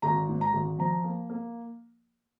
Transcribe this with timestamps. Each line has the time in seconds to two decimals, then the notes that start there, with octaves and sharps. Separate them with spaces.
0.02 G#1 A#5
0.28 G#2
0.41 A#5
0.53 G#1
0.79 F3 A#5
1.04 A#3
1.30 A#3